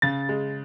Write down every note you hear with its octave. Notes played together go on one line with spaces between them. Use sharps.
C#3 A6
G#3